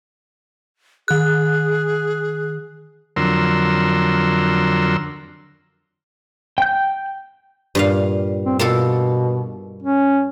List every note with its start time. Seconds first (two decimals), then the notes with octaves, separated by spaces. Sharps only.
1.08 D#3 G#4 F#6
3.16 F2 D3 F#3 A#4 C6 E6
6.58 G5 G6
7.75 G2 A#2 F5
8.46 C4
8.59 B2 A#3 F4 A4
9.83 C#4